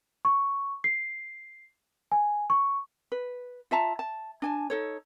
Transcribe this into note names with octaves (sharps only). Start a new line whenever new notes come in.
C#6
C7
G#5
C#6
B4
F4 E5 A5 A#5
A5
D4 G#5 A5
D#4 A4 C#5